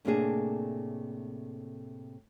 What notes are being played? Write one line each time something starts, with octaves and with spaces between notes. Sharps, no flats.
A2 C3 A3 A#3 D4 G#4